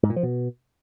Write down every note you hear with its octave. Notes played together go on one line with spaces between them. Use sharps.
G#2
A#2
F3
B2